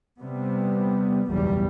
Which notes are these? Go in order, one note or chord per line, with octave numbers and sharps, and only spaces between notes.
C3 G3 B3
F#1 B1 E2 G3